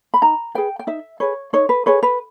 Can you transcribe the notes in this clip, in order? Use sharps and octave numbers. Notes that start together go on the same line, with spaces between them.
B5
D#4 A#5
G#4 B4 G5
G5
D#4 E5
G#4 B4 C#5
D#4 C#5
B4
G#4 B4 C#5
B4